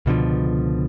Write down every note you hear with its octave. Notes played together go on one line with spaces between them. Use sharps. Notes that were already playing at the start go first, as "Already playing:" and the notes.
C#2 B2 D3 F3